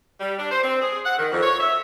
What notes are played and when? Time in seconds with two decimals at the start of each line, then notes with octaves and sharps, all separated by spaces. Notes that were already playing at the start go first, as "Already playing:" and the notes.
0.21 G3
0.38 D4
0.52 C5
0.63 C4
0.81 G#4
1.04 F#5
1.18 D#3
1.31 F2
1.43 C#5
1.60 E5